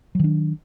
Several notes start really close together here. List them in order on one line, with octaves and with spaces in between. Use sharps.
F#3 D#3 D4